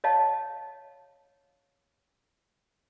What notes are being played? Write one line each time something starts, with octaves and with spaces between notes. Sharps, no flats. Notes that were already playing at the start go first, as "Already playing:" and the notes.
C#5 D#5 F5 A5